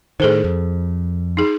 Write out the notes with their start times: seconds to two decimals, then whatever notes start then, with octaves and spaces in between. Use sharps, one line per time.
0.20 A2 D#3 G#4 A4 C5
0.44 F2
1.37 D#4 G#4